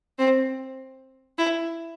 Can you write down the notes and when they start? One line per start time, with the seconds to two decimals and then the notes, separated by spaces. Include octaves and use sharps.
0.19 C4
1.38 E4